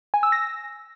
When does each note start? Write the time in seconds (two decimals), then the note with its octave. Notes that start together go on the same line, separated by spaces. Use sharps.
0.14 G#5
0.23 E6
0.32 A#6